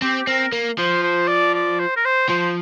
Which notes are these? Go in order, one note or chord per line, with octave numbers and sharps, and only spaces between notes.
C4 G4
G4
C4 A#4
A#3
F3 C5
C5
D5
D5
C5
A#4
C5
F3 C5